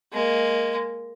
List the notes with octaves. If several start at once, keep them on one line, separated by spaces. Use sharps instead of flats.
G#3 A#3